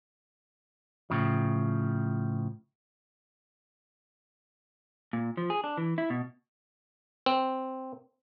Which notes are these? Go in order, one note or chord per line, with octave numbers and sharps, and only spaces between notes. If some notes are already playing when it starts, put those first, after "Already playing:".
A2 C#3 F3
A#2
F3
G#4
D4
E3
E4
B2
C4